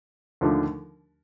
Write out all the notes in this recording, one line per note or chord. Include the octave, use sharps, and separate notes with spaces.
D#2 D3 F3 A3 D4